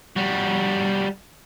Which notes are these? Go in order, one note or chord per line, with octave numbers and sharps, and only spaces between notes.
G3 F#4